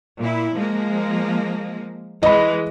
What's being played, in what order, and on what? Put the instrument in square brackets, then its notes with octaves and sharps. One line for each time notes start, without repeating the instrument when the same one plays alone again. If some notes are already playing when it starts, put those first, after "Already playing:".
[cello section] A#2 E4
F3 G#3 A#3
[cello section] E3 G#3 [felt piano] D#5 B5